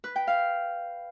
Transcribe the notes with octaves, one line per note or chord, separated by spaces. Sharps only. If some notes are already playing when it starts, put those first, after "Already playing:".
B4
G5
F5